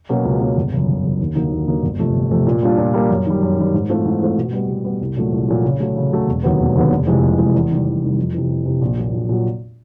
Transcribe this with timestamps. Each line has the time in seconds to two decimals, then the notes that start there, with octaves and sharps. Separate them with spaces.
0.09 B2 F#3 A#3 C#4
0.25 C#2
0.40 B2 F#3 A#3 C#4
0.57 G1
0.73 F#2 C#3
0.88 G1
1.04 F#2 C#3
1.20 D#2
1.35 D3 F#3 A#3 D#4
1.52 D#2
1.68 D3 F#3 A#3 D#4
1.83 G1
1.99 F2 C3 F3 A3
2.15 G1
2.31 F2 C3 F3 A3
2.47 A#2
2.63 G3 A#3 D4 F4
2.78 A#2
2.94 G3 A#3 D4 F4
3.10 F#2
3.26 D#3 G3
3.42 F#2
3.58 D#3 G3
3.74 G#2
3.89 E3 A3 C4 F4
4.05 G#2
4.21 E3 A3 C4 F4
4.37 B2
4.53 G3 B3
4.69 B2
4.84 G3 B3
5.01 C2
5.17 A#2 F#3 A3
5.32 C2
5.48 A#2 F#3 A3
5.65 C#3
5.80 F#3 A3
5.96 C#3
6.12 F#3 A3
6.27 E1
6.43 D#2 D3 F#3 B3
6.60 E1
6.75 D#2 D3 F#3 B3
6.91 F1
7.07 F2 C3 E3 G#3
7.23 F1
7.38 F2 C3 E3 G#3
7.54 E2
7.70 C3 D#3 G3
7.87 E2
8.03 C3 D#3 G3
8.18 F2
8.34 C3 E3
8.50 F2
8.66 C3 E3
8.81 A#1
8.97 A#2 F#3
9.13 A#1
9.29 A#2 F#3